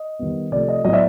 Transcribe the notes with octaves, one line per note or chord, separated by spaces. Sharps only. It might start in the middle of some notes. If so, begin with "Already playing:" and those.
Already playing: D#5
D#3 G3 B3
C3 F3 A3 D5
D#5
A2 F#3 B3 D#5
D5 E5